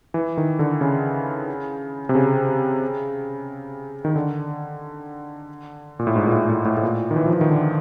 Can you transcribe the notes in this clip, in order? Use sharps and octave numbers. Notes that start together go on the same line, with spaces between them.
E3
D#3
D3
C#3
C3
C#3
D#3
D3
A#2
A2
G#2
A#2
A2
A2
A2
A2
A#2
D#3
E3
F3
E3
D#3
D3